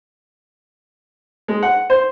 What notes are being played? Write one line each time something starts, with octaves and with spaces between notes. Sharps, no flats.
G#3
F#5
C5